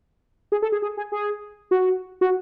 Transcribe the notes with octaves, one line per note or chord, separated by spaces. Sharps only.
G#4
A4
G#4
G#4
G#4
G#4
F#4
F#4